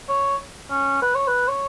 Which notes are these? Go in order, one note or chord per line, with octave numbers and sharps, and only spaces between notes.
C#5
C#4
B4
C#5
B4
C#5